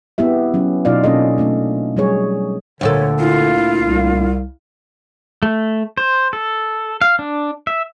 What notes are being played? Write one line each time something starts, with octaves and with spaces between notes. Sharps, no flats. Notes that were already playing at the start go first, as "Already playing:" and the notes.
B3 C4 E4 G4 E5
F#3 C#4
B2 F#3 D#4 F4 D5 F5
B2 A#3 C#4 D4 A4 D#5
A3 C4 D4
F#3 G3 G#4 C#5
D2 A#2 D3 A4 C#5
E4 F4 F5
C2
A3
C5
A4
F5
D4
E5